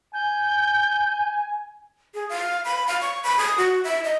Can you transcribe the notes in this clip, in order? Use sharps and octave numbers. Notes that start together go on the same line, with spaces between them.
G#5 G6
G#4
F5
B5
F5
C#6
B5
D#6
F#4
E5
D#5